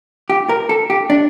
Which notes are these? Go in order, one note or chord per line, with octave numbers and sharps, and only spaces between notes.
G4
A#4
A4
G4
D4